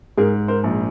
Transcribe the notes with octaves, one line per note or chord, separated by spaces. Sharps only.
G#2 G#4 A#4
A#4 C5
A#1